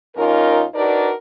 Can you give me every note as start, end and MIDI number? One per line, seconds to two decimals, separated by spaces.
0.16 0.63 39
0.16 0.63 61
0.16 0.63 63
0.16 0.63 65
0.16 0.63 70
0.74 1.11 62
0.74 1.11 63
0.74 1.11 66
0.74 1.11 70
0.74 1.11 71
0.74 1.11 74